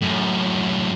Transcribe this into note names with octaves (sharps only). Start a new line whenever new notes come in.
F#2 A2